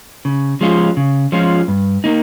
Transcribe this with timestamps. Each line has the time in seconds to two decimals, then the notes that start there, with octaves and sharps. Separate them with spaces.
0.25 C#3
0.61 F3 G#3 C#4 F4
0.97 C#3
1.32 F3 G#3 C#4 F4
1.68 G2
2.04 A#3 D#4